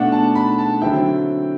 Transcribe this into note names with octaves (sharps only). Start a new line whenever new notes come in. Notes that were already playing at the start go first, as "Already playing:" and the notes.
Already playing: B2 A3 D4 F#5
A5
B5
A5
D3 F#3 C4 E4 G5